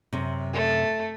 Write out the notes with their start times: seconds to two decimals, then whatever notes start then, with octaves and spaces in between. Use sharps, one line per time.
0.13 F#2 C3
0.53 A3